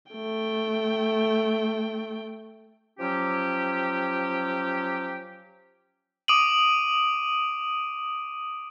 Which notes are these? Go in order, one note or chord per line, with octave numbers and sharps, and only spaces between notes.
A3 G5
F3 F#3 C#4 G4
D6 D#6 D7 D#7 F#7